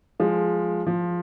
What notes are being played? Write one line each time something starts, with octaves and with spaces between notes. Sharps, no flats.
F3 G#3
F3